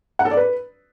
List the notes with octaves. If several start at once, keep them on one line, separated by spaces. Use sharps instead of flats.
F#5
A4
D5
B4